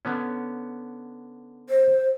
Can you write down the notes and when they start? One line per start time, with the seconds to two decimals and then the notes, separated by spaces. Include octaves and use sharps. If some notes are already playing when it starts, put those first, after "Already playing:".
0.05 D3 B3 C#4
1.69 C5